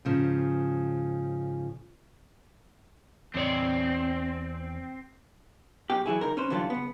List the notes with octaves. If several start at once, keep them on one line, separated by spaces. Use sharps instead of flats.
G#2 C#3 F3
E2 C4 C#5 D5
B1 B2 G4
E3 F#3 E4 G#4
C#2 D#4 A#4
C#4 B4 C5
D3 E3 F#3 G3 C#4 F4
C#2 B3